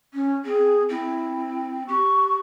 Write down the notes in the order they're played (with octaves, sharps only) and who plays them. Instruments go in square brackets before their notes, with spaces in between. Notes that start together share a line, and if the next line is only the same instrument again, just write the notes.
[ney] C#4
[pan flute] C4 [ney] G#4
[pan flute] C4 [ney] E4
[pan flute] G4 [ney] C#6